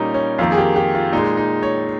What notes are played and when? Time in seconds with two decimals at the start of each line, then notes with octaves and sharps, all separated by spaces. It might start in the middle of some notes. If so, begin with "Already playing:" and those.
Already playing: A#2 G3 A#3 C#4 D#4
0.14 C#4
0.38 F2 D#3 A#3 F4
0.52 G#4
0.58 G4
0.76 G4
0.95 F4
1.12 A#2 G#3 D#4
1.37 D#4
1.63 C#5